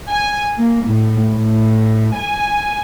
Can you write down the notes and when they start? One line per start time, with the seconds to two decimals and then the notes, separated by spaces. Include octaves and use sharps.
0.11 G#5
0.57 A#3
0.86 A2
1.30 A2
2.14 G#5